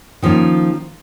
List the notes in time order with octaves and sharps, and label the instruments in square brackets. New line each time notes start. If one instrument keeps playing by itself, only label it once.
[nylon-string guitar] D#3 F3 A#3 C#4